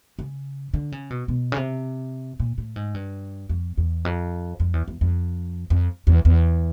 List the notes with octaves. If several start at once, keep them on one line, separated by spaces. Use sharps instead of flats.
C#3
D3
C#3
B2
B2
C#3
C3
A#2
A2
G#2
G2
F2
E2
F2
F2
E2
E2
F2
F2
E2
E2